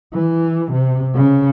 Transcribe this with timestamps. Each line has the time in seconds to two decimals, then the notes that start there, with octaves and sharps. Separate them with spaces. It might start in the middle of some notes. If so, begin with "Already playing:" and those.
0.14 E3
0.72 C3
1.15 C#3